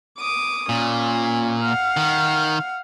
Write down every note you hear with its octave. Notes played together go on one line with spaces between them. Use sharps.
D6 D#6
A#2 C#4
F5 F#5
D#3